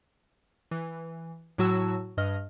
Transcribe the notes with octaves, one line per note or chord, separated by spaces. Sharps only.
E3
A2 F#3 F#4 A5 E6
G2 D#5 F6